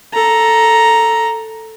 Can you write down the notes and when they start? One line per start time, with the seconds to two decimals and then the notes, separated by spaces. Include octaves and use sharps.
0.13 A4 A#5